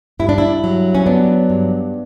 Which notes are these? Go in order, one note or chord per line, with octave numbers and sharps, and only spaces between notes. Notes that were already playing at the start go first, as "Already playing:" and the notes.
G2 E4
D4
E4
F#3
C#4
B3 D4
G2